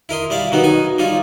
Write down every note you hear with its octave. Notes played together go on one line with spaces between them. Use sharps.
E4 A#4 D#5 C6
G3 E4 D5 F5
D#3 F#3 B3 D#4
D#4 G#5
G3 D#4 F4 C#5